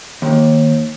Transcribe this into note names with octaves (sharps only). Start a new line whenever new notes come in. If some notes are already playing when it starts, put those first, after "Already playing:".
D#2